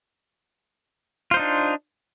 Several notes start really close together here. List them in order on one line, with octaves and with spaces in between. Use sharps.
F4 C5 D#4 D4